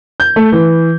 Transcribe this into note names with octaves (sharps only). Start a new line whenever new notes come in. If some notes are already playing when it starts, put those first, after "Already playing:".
G6
A3
E3